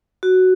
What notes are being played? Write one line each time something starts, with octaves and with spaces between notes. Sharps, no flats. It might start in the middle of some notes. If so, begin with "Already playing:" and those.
F#4